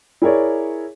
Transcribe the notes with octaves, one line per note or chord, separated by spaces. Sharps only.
E4 G#4 A#4 C#5 D5